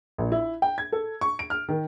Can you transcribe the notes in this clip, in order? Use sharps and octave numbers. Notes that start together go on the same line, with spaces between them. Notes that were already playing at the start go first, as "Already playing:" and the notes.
A#1
E4
G5
G#6
A4
C#6
D7
F6
D#3